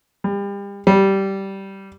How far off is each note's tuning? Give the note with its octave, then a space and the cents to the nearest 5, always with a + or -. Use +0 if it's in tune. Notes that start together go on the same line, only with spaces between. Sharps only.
G3 +35
G3 -10